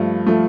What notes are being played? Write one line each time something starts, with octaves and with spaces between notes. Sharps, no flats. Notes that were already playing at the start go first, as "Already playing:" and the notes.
Already playing: G2 F3 A3
F3 A3